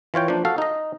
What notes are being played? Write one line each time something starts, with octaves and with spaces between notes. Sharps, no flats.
E3 F4 C#5 G5
F3 A#3 D4
F#4 A4 F5
D#4 D#5